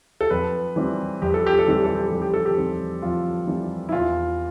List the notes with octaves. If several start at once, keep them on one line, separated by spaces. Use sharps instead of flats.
A4
F2 B4
E3 G3 C4
F2 G4
A4
G4
A4
E3 G3 C4 G4
A4
G4
F2 A4
G4
A4
G4
E3 G3 C4
F2 F4
E3 G3 C4
E4
E2 F4